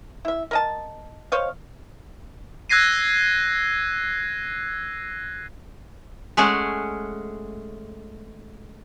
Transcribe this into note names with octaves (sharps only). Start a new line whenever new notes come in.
E4 E5
A#4 D#5 A5
C5 C#5 D#5 F5
E6 F#6 G#6 A#6 C7 D#7
G#3 A3 C#4 G#4 F#5